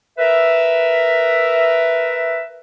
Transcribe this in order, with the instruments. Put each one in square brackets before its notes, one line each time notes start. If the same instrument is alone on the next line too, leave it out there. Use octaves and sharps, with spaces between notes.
[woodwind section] A#4 B4 E5